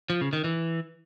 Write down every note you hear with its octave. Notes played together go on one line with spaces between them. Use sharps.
F3
C#3
D#3
E3